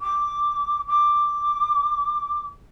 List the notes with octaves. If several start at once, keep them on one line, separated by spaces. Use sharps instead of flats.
D6
D6